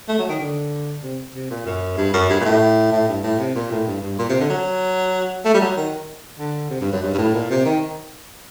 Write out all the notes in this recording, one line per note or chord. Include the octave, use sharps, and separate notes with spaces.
A3
F#3
D#3
D3
C3
C3
A#2
F#2
G2
F#2
G2
A#2
A2
A2
G2
A2
C3
A#2
A2
G2
G2
A#2
C3
D3
F#3
A3
G3
F#3
D#3
D3
C3
G2
F#2
G2
G2
A2
A#2
C3
D#3